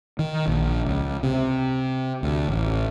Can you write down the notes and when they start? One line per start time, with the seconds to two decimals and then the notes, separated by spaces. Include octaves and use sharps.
0.19 D#3
0.47 A#1
0.87 C#2
1.23 C3
2.23 D2
2.48 A1